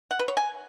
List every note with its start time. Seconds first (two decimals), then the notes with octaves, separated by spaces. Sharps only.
0.11 F#5
0.19 B4
0.28 C#5
0.37 G#5